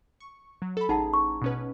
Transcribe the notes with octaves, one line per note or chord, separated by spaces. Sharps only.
C#6
F#3
A4 B5
A1 D#4 G#4 F#5 A5 A#5
C#6
B2 C#4 B4